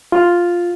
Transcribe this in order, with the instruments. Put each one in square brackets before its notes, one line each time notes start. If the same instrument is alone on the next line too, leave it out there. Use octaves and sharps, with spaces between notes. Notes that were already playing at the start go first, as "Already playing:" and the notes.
[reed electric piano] F4